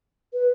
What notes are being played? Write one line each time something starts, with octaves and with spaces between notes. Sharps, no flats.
B4